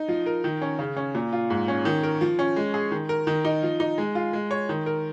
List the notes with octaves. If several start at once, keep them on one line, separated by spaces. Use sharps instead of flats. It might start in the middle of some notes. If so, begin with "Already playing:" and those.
Already playing: D#4
F3
A#4
D#3
C#4
C#3
C#4
A#2
F4
G#2
C#4
D#3
A#4
F3
C#4
G#3
G#4
D#3
A#4
D#3
D#4
F3
D#4
G#3
F4
G#3
C#5
D#3
A#4